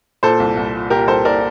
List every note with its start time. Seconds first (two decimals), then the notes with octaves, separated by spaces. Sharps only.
0.23 A#2 A4 C5
0.40 C2
0.57 C2
0.74 A#2
0.90 A#2 G4 A#4
1.07 C2 A4 C5
1.25 A#2 A#4 D5